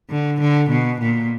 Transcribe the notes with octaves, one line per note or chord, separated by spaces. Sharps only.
D3
D3
B2
A#2